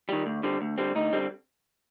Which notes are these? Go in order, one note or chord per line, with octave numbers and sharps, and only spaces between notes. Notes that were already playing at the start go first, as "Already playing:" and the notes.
D#3 G3
D2
D3 G3 C4
D2
D3 G3 C4
D2 D#4
D3 G3 C4